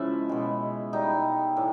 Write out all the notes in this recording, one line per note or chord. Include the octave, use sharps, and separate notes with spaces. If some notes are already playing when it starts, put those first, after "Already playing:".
Already playing: C#3 F3 G#3 E4
B2 G#3
B2 G3 D#4
A2 E3